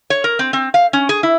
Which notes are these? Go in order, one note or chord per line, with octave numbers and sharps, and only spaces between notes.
C#5
A#4
C4
C4
F5
C#4
G#4
E4